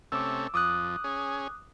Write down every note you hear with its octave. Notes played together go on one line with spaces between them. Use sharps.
C3 A3 C#4 D6 E6
F2 D6 D#6 F#6
C#4 G#4